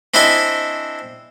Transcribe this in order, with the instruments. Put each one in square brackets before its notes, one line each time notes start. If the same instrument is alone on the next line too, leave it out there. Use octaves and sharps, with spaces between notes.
[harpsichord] C4 D4 E4 G#4 D#5 G#5